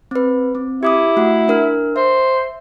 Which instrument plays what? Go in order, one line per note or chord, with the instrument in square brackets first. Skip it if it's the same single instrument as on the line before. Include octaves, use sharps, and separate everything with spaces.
[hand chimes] C4 B4
C4
[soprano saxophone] E4 [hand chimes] G4 D6 D#6
[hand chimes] A3 F#4 F#5
D4 A#4 F6
[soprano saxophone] C5 [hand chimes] E5